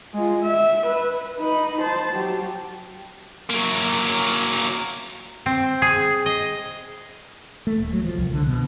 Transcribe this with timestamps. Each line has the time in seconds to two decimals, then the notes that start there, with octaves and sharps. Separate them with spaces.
0.14 G#3 F4
0.43 E5
0.87 B4
1.39 D#4 B5
1.81 C5 A5
2.13 F#3 G4
3.50 F#3 A#3
5.46 C4
5.82 G#4
6.26 D#5
7.67 A3
7.80 D#1
7.93 F#3
8.04 F3
8.18 C2
8.34 D3
8.47 B2